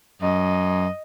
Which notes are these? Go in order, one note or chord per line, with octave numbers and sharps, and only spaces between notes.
F#2 D#5